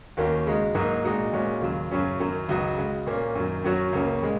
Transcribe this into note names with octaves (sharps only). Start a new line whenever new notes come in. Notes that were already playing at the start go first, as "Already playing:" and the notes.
D#2 D#3 A#3 C#4 F#4
C#3 G#3 D#4 F#4
G#2 F#3 A#3 D#4 F#4
A#2 G#3 D#4 F#4
A#2 G#3 C#4 F#4
D#2 C#3 F#3
F#2 C#3 F#3 C#4
F#2 D#3 F#3
C#2 C#3 F#3 D#4 F#4
C#3 G#3 F#4
A#2 A#3 C#4
F#2 D#3 F#3
F#2 F#3 C#4 F#4
C#2 C#3 A#3 C#4
A#2 G#3